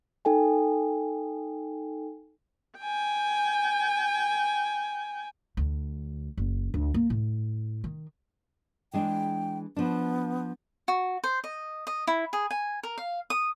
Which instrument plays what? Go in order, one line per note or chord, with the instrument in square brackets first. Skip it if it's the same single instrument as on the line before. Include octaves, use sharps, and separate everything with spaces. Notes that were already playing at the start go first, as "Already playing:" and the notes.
[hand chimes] D#4 A4 G5 G#5
[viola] G5 G#5
[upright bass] D2
F#1
D2
A#3
A2
D#3
[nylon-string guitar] E3 G#3 D4 [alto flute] G5
[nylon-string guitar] F3 D4 [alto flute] B3
[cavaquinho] F#4
C5
D#5
D#5
E4
G#4
G#5
A#4
F5
D#6